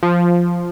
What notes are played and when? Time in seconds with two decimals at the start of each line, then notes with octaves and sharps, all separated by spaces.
0.03 F3